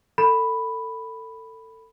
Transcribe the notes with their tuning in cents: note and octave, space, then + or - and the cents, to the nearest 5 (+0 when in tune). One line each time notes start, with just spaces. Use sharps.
A4 +30 B5 +0